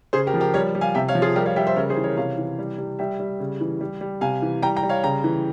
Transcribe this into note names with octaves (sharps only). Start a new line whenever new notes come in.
C#3 G#4 C5
G4 A#4
F3
G4 A#4
G3 A#4 C#5
G3
F5 G#5
C3 E5 G5
C#5 F5
F3
F4 G#4
G3 G4 A#4
C#5 F5
G3 E5 G5
C5 E5
C#3 A#4 C#5
G#4 C5
E3
A#4 C#5
C3 C#5 F5
E3
G3
G3
G3 E5 G5
G3
C#3
E3
G3
G3
C3 F5 G#5
E3
G3 G5 A#5
G5 A#5
G3
C#5 F5
C#3 G5 A#5
E3